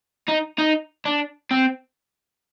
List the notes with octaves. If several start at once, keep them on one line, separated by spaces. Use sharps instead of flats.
D#4
D#4
D4
C4